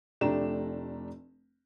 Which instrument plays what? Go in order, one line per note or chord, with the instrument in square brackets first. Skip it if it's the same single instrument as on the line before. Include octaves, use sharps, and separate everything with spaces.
[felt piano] F1 A3 D4 G4 A#5 E7